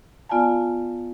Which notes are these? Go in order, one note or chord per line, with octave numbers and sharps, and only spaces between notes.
B3 F4 D5 F5 G#5 A5